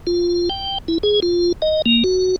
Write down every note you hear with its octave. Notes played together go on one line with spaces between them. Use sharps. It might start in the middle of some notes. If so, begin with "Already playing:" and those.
F4
G5
E4
G#4
F4
D#5
A#3
F#4